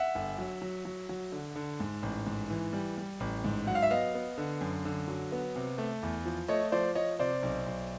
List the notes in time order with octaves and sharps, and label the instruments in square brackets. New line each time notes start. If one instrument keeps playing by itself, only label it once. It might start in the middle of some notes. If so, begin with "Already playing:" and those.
Already playing: [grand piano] E5 F#5
G1
F#3
F#3
F#3
F#3
D3
D3
G#2
A1
G#2
E3
G3
G3
A1
G#2
F#3 F#5
F5
E5
B3 D#5 F5
B3
D3
F#2
D3
F#3
B3
C3
A3
E2
F3
A3 C#5 D#5
F3 C5 D5
F3 C#5 D#5
C3 C5 D5
B1
B1